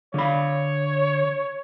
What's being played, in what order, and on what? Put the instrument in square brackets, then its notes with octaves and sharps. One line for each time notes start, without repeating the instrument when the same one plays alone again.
[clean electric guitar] D3 B5 [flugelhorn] C#5